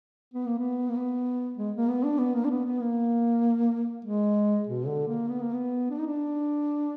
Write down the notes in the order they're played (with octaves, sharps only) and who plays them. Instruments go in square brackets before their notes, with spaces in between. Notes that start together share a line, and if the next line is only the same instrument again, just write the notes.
[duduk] B3
A#3
B3
A#3
B3
G#3
A#3
B3
D4
B3
A#3
D4
B3
B3
A#3
G#3
B2
D3
A#3
B3
A#3
B3
D4
D#4
D4